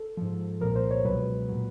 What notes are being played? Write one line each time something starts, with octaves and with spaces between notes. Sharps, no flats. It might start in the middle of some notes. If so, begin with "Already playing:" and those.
Already playing: A4
G#2 F3
C2 A#2 F3 A#4
C5
C#5
C#2 B2 F#3 B4
A#2 F#3